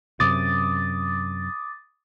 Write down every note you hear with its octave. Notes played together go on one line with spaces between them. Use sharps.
F#2 C3 D6 D#6 A6